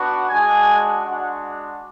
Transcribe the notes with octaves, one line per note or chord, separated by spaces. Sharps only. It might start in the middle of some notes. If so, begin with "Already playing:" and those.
Already playing: B3 D4 F#4
G#3 D4 F#4 G#5
G#3 D4 F#4 F#5